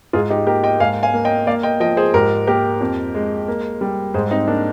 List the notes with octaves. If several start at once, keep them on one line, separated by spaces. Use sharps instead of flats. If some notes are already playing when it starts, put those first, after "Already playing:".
G#2 F4 G#4
D#4 G4
A#3 G4 A#4
D#5 G5
G#2 F5 G#5
F5 G#5
A#3
D#5 G5
A#3 D5 F5
D#5 G5
F3 D#5 G5
G#4 C5
G#2 G4 A#4
A#3 G4 A#4
F2
G#3
A#3
G3
G#2 G#4 C5
C4 D#4
A#3 D4